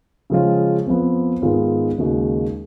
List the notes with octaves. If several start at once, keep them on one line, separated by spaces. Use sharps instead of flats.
C#3 F3 G#3 C#4 F4
F2 F3 B3
G#2 D#3 G#3 B3 F4
D#2 C#3 G#3 D#4 F#4